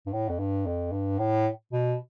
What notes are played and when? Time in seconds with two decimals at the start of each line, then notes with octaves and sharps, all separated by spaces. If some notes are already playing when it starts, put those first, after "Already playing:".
0.07 G2
0.13 A2
0.29 F2
0.39 G2
0.66 F2
0.92 G2
1.19 A2
1.73 B2